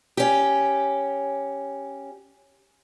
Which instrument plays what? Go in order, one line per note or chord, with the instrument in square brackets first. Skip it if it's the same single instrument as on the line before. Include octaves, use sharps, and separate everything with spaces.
[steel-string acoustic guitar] C#4 G4